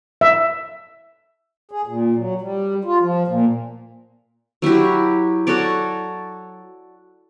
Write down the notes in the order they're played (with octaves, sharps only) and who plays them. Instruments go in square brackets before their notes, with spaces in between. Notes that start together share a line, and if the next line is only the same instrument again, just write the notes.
[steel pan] E5
[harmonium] G#4
A#2
F#3
G3
F4
F3
A#2
[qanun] F#3 E4 F#4 G4
F#4 A4 C#5 D5